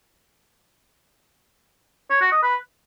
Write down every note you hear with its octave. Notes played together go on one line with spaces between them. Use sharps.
C#5
F#4
D#5
B4